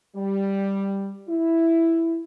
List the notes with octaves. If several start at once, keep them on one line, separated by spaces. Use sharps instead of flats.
G3
E4